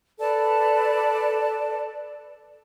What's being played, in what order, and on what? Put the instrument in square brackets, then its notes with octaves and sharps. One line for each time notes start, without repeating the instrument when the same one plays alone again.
[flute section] A4 B4 D5 A5